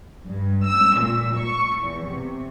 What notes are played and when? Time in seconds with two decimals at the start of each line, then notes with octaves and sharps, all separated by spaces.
0.27 G2
0.68 E6
1.01 A#2
1.39 C#6
1.81 E2
2.10 C3